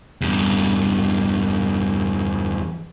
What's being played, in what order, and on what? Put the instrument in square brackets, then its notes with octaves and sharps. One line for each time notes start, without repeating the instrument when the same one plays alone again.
[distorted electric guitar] E2 G2